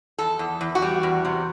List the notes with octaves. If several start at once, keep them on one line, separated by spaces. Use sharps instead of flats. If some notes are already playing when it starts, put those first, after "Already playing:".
E2 A4
E2
E2
F#4
G3
E2
C3